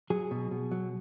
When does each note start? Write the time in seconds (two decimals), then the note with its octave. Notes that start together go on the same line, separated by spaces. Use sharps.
0.10 F#3 G#4
0.31 B2
0.51 B2
0.72 F#3